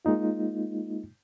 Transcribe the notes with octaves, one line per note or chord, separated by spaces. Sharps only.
G#3 A#3 D#4 F4